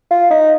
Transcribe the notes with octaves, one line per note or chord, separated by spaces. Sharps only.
F4
D#4